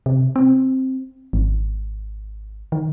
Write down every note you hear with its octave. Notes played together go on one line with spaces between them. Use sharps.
C3
C4
G#1
D#3